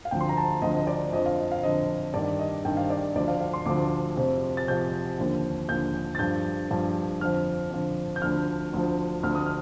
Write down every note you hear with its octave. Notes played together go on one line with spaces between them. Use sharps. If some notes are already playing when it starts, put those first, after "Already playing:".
F5
D2 D3 F3 G5
C6
A#5
A5
D2 D3 F3 D#5
D#5
D5
F2 D3 F3 D#5
F5
D#5
F5
F2 D3 F3 D#5
G2 D#3 D5
D#5
G2 D#3 G5
F5
D5
D2 D3 F3 D5
F5
F5
C6
D2 D3 F3 D6
F2 C3 F3
A6
F2 C3 F3 G6
D#2 D3 F3
D#2 D3 F3 G6
A6
G2 F3 G6
G2 F3
F2 D3 F3 F6
F2 D3 F3
G6
D2 D3 F3 F6
D2 D3 F3
D2 D3 F3 F6
D#6
F6